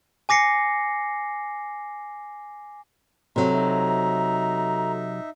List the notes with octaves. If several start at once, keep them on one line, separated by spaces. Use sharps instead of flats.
G#5 D6 A#6 C7 C#7
C3 F#3 F#4 A4 A#5 C6
D#4 E5